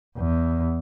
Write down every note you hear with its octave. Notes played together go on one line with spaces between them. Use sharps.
E2